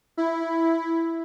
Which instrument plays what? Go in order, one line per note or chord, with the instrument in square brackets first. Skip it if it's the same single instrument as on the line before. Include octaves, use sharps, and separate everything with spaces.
[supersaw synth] E4